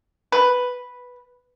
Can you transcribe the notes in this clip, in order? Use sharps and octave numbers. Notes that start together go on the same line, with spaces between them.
B4